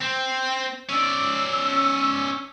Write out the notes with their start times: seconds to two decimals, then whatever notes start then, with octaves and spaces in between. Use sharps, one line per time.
0.01 C4
0.89 C#4 D5 E6